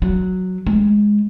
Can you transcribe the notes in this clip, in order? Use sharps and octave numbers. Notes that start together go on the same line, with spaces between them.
F#3
G#3